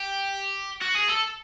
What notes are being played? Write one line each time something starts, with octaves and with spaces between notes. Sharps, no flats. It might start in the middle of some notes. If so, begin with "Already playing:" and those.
Already playing: G4
F#4
G#4
A4